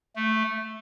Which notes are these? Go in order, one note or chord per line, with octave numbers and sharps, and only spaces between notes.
A3